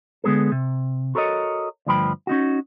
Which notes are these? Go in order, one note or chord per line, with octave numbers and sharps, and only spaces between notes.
D3 G#3 B3 G#4 A4
C3
F#4 A4 A#4 C#5 D#5
D2 G2 F3 B4 G5 B5
C#4 D#4 F#4